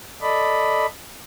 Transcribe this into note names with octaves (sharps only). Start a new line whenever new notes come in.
A4 D5 D#5 B5